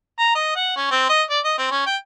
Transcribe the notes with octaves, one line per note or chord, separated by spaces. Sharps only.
A#5
D#5
F#5
C#4
C4
D#5
D5
D#5
C4
C#4
G5